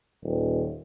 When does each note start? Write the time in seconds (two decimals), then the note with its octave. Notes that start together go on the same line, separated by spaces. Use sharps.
0.23 D#1